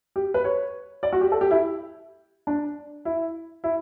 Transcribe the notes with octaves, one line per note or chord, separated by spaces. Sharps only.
G4
B4
C#5
D5
F#4
G4
A4
G4
E4
D4
E4
E4